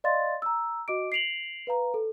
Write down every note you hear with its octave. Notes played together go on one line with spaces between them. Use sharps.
D5 D#5 F5 C6 A6
A#5 E6
F#4 D#5 D6 D7
C7 D7 F7 F#7
B4 F5 A#5
A4